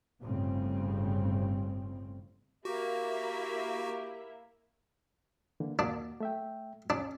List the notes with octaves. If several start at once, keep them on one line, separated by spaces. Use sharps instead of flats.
G1 A2 C#3 G3 C4
A#3 E4 F#4 G4 E5
D3 E3 A#3
D#2 A#3 D4 F#4
A3 E5 G5
C#4 D4